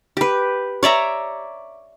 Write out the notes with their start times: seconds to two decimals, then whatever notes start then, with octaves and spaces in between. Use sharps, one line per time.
0.17 G4 B4
0.83 C#5 D5 E5 A#5